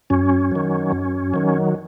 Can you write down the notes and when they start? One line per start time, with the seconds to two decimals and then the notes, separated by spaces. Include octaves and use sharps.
0.10 F#2 C#4
0.51 D#3 F#3
0.92 F#2
1.34 D#3 F#3